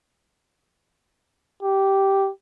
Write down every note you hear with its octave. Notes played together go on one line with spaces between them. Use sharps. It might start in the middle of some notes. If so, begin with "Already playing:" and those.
G4